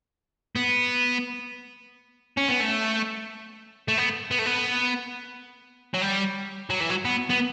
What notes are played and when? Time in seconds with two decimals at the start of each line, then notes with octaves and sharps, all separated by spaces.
0.56 B3
2.37 C#4
2.48 B3
2.60 A3
3.88 A3
3.98 B3
4.31 B3
4.39 A3
4.46 B3
5.94 F#3
6.02 G3
6.70 F#3
6.80 E3
6.89 F#3
7.05 B3
7.30 B3